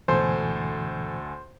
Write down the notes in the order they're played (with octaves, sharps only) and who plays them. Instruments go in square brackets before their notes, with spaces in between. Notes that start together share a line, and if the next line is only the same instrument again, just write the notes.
[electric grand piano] D2 A4 G#5 [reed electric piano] G#2 B2 E3 [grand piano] C5